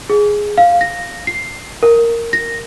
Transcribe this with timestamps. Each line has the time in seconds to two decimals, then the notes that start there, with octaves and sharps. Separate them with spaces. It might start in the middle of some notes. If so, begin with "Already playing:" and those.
0.10 G#4
0.58 F5
0.81 A#6
1.27 C7
1.83 A#4
2.33 A#6